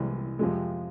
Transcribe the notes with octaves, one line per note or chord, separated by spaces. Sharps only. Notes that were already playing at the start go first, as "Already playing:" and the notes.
Already playing: C2 C3 E3 G#3
F2 C3 F3 G#3